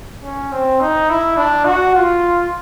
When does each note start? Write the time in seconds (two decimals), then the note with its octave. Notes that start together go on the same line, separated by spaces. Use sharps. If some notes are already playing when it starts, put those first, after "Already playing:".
0.23 C#4
0.52 C4
0.81 D#4
1.09 E4
1.37 D4
1.65 F#4
1.95 F4